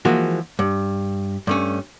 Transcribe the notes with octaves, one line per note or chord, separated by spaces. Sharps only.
E3 F3 G#3 A#3 F#4
G2
G2 A3 C#4